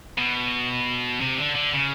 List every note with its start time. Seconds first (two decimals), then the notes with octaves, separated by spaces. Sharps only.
0.18 B2
1.21 C3
1.39 D3
1.56 D3
1.74 C#3